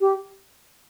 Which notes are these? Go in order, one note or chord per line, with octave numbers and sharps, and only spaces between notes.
G4